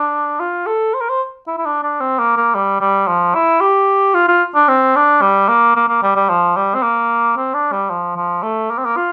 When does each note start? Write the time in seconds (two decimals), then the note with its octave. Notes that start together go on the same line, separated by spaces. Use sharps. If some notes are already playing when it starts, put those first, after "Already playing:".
Already playing: D4
0.40 F4
0.67 A4
0.94 C5
1.01 A#4
1.09 C5
1.47 E4
1.58 E4
1.66 D4
1.83 D4
2.00 C4
2.19 A#3
2.37 A#3
2.55 G3
2.81 G3
3.07 F3
3.35 E4
3.61 G4
4.15 F4
4.29 F4
4.55 D4
4.69 C4
4.96 D4
5.22 G3
5.49 A#3
5.76 A#3
5.89 A#3
6.03 G3
6.16 G3
6.29 F3
6.56 G3
6.75 C4
6.83 A#3
7.37 C4
7.54 D4
7.72 G3
7.90 F3
8.17 F3
8.43 A3
8.70 A#3
8.78 C4
8.85 A#3
8.97 F4